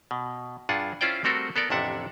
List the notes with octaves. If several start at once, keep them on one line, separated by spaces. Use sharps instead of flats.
B2
G2 D4 F4 G#4 F#5
C#4 E4 F4 C5 D5 G5
G3 A3 C4 F#4 A4 A#4
B3 A4 A#4 D5
A1 F2 C3 D4 E5 F#5